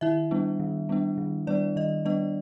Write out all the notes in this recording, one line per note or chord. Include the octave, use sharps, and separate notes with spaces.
D#3 E4 E5
G3 B3 D4
D#3
G3 B3 D4
D#3
G3 B3 D4 D5
D#3 D#5
G3 B3 D4 D#5